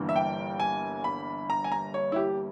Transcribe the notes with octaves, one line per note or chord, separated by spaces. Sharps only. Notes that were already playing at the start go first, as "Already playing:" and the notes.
Already playing: G1 G2 E3 A#3
E5
G5
G#5
B5
A#5
G#5
A#5
C#5
E4
G4